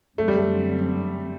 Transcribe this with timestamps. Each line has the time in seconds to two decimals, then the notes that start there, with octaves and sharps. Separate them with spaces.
0.18 F#2 D3 F#3 A3 C4
0.28 G3
0.38 A3